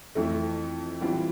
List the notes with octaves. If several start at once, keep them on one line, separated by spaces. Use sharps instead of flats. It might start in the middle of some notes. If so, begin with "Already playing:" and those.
F2 E3 A3
E3 G3 C4 F4